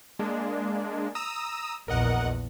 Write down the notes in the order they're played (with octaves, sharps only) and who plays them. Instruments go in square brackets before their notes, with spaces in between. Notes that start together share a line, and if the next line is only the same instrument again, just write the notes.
[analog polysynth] G#3 A#3 D4
A#5 D#6 E6
[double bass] A#1 E2 [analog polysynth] A#4 D#5 F#5